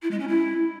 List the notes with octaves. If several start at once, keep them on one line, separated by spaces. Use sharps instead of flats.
E4
G#3
C#4
E4